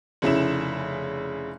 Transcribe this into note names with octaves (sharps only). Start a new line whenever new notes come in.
F1 C#3 E4 E7